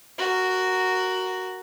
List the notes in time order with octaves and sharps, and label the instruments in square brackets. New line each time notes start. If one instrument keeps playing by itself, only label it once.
[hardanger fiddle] F#4 A#4